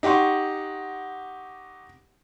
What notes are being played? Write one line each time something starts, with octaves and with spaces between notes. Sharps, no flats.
D#4 G4 F#5 C6 C#6